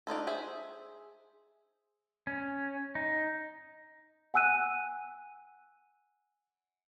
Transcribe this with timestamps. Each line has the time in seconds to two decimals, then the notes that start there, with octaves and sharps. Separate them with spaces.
0.07 D4 D#4 F4 A4
0.27 G#4 C5 E5
2.27 C#4
2.95 D#4
4.34 F#5 G#5 E6 F#6 D#7